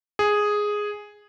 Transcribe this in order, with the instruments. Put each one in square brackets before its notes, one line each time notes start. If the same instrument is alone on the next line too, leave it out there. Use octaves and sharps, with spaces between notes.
[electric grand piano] G#4